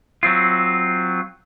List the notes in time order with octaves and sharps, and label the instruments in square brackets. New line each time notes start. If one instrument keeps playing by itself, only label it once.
[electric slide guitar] F#3 C4 F4